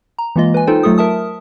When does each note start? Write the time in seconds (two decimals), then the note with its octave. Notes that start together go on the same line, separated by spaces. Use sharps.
0.19 A#5
0.36 E3 G#3 A#3 F4 D#5
0.54 B4 G#5
0.67 D#4 F4 A4 C5 G5
0.83 F#3 A3 F4 A4 D#6
0.98 A#4 E5 A5 D#6